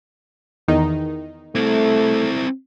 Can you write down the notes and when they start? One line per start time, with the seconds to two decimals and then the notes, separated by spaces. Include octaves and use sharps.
0.68 E2 D#3 D#4
1.55 A3 C4 E4